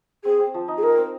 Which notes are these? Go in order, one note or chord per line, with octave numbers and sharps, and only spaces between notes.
C4 G#4
C4
F3
D#4
G#4
D#4 A#4
C4